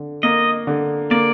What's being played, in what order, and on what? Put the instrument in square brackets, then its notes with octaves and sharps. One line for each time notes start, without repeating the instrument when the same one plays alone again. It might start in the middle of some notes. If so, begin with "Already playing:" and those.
Already playing: [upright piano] D3
[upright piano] A#3 [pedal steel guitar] D#5
[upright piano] D3
[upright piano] A#3 [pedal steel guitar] D5